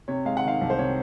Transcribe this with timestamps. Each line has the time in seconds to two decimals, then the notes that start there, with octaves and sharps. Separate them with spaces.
0.08 C3 C#5
0.25 G#3 F5
0.37 F#5
0.44 D#3 F5
0.61 C2
0.70 C5
0.78 C3 C#5